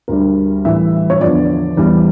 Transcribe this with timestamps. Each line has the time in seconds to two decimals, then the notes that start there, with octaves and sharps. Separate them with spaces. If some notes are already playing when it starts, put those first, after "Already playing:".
0.08 D2 D3 G3 A#4
0.65 A2 E3 G3 E5
1.10 C#5
1.21 E2 D3 F3 D5
1.77 E2 E3 G3